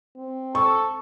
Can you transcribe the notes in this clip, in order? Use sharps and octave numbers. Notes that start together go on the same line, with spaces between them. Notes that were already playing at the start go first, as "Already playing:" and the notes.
C4
A4 C#6